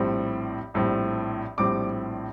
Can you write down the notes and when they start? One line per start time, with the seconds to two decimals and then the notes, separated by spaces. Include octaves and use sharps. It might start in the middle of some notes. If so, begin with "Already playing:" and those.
Already playing: A#1 A2 G3 C4
0.74 A#1 A2 G3 C4
1.58 A#1 A2 G3 C4 D6